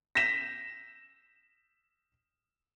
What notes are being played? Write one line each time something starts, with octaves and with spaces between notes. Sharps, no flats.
A#6 B6 E7